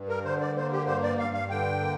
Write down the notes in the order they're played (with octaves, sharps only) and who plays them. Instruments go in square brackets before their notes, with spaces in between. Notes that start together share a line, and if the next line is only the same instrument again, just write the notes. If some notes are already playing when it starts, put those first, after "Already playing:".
Already playing: [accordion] G2
A#4
D3 C5
D5
A#3 C5
G4
G2 C5
D5
G2 F5
F5
D3 G5
A#3